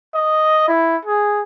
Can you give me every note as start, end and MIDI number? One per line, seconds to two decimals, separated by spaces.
0.14 0.68 75
0.68 0.96 64
1.05 1.42 68